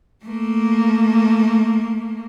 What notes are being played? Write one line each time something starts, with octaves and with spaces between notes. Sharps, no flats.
A3 A#3